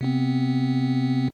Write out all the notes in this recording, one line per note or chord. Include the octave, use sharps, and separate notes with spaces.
C3 B3 C4